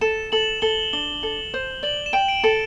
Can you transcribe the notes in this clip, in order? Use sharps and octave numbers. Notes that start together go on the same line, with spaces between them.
A4 E7
A4 F#7
A4 G7
D4 G7
A4
C5
D5 F#7
E7
G5
D7
A4